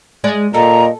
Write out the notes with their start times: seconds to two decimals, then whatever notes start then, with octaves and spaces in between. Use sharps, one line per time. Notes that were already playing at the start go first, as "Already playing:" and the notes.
0.24 G#3 G#4 D5
0.54 A#2 A4 D#5 A#5